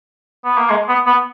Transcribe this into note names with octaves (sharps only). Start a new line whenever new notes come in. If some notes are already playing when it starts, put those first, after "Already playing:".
B3
A#3
G#3
B3
B3